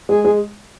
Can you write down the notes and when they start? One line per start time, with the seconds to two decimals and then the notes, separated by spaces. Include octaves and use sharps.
0.09 G#3 G#4
0.24 G#3 G#4